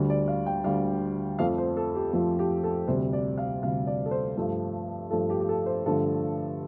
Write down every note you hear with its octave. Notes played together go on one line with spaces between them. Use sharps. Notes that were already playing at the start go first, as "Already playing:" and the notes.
Already playing: D2 D3 G3
D5
F5
G5
D2 D3 G3 F5
F2 F3 A3 F5
C5
A4
G4
F2 F3 A3 A4
G4
A4
D2 C3 G3 C5
D5
F5
D2 C3 G3 F5
D5
A4
C5
G2 F3 A3
G2 F3 A3 A4
G4
G4
A4
C5
G2 D3 F3 A3 A4